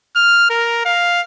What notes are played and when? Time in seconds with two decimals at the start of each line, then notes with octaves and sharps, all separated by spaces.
0.16 F6
0.50 A#4
0.85 F5